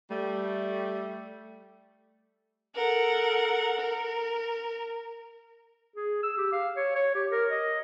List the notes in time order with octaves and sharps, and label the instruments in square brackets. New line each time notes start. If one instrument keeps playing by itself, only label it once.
[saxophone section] G3 A3
[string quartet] A4 A#4 F#5
A#4
[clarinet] G#4
E6
G4
F5
C#5
C#5
G4
A#4
D#5